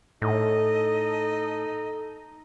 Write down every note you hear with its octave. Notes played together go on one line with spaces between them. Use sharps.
A2 D#4 A4 D#5